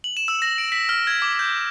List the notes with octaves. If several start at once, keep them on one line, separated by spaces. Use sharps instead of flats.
F#7
E7
E6
A#6
D7
B6
F6
G#6
D6
G6